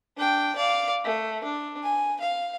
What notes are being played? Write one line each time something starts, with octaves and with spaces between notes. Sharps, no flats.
D4 G5
D5 F5
A3
D4
G#5
F5